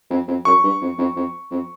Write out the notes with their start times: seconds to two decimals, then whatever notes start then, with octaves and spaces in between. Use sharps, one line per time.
0.10 F2
0.28 F2
0.45 F#2 C#6
0.63 G2
0.81 F2
0.98 F2
1.16 F2
1.51 F2